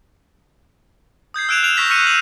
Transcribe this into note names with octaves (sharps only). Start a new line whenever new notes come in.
D#6 G6 G#6 C7
E6 F#6 D7 E7 F7
F6 D7 E7 F7
C#6 E6 G6 A#6 B6 F7
C#6 E6 F6 C#7 D#7
E6 F#6 D#7 E7 F#7